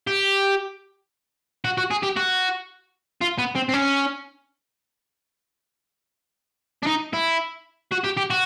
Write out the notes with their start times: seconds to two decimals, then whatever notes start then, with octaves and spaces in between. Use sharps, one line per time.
0.07 G4
1.65 F#4
1.78 F#4
1.91 G#4
2.03 G4
2.16 F#4
3.21 F4
3.38 B3
3.56 C4
3.69 C4
3.74 C#4
6.83 D4
6.86 D#4
7.13 E4
7.92 F#4
8.04 G4
8.17 G4
8.30 F#4